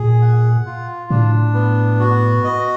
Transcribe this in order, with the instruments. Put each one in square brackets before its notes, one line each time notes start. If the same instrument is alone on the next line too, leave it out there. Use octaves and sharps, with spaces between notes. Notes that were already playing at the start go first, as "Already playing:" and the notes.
Already playing: [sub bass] A#2 [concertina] G#4
[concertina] F#5
F4
[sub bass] A2 [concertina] D4
[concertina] B3
F#4
D#5